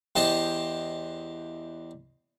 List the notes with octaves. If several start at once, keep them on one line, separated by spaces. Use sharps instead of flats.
E2 G4 C5 D#5 A5